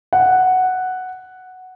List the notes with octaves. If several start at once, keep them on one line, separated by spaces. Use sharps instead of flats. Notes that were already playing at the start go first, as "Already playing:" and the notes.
F#5